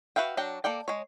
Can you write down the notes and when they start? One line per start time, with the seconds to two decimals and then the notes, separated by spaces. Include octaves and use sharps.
0.16 F#4 B4 E5 F5 G5
0.37 F#3 D4 F#4 G5
0.64 A#3 A4 D5 G5
0.88 G#3 C#5